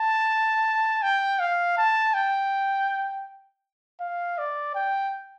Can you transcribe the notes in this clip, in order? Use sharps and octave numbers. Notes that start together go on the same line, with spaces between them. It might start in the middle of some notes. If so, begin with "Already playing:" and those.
Already playing: A5
G5
F5
A5
G5
F5
D5
G5